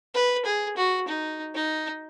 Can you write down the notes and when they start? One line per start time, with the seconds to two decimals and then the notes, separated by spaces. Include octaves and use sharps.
0.14 B4
0.45 G#4
0.77 F#4
1.08 D#4
1.55 D#4